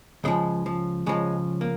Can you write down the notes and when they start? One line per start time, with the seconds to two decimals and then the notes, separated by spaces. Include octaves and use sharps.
0.24 C#2 C#3 F3 G#3
0.66 F3
1.06 C#2 C#3 F3 G#3
1.61 A#3